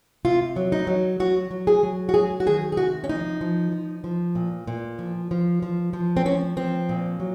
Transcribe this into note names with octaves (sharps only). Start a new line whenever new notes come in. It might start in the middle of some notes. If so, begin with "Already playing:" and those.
C3 F4
F#3
D#4
F#3
F#3 F#4
F#3
G#4
F#3
F#4
F#3 G#4
F#4
D#3 G#4
G#4
C3 F#4
C#4
F3 D#4
F3
F3
F3
A#2
A#2
F3
F3
F3
F3
C4
F3 C#4
F3 C4
A#2
F#3